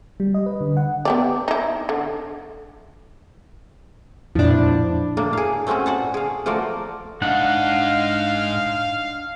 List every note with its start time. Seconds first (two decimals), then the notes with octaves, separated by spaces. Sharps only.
0.20 G3
0.34 D#5
0.46 B4
0.61 D3
0.77 F#5
1.05 B3 G4 D5
1.48 D#4 E4
1.89 D3
4.35 F2 A#2 F3 G#3 D4 E4
5.17 A2 A#3 D4
5.33 G#4 F5
5.67 A3 C4 C#4 F#4 G#4
5.86 A#2 F#4 F#5 A5
6.14 G#4 F5
6.46 F3 A3 F#4 A#4 D5
7.22 G#2 D4 D#4 F5 F#5